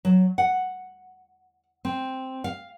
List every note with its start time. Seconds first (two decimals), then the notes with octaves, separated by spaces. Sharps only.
0.05 F#3
0.38 F#5
1.85 C4
2.44 F5